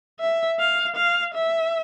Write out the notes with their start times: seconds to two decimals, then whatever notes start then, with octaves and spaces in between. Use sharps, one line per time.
0.21 E5
0.59 F5
0.96 F5
1.34 E5